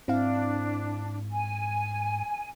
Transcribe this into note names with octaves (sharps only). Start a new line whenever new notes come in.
G#2 C4 D4 E4 F5
G#5